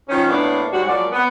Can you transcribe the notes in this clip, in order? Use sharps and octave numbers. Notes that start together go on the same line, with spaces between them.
D#3 F3 C#4
A2 A#3 B3 D4
G#2 F#3 G3 F#4
F3 F#3 G#3 A#3 D5
B3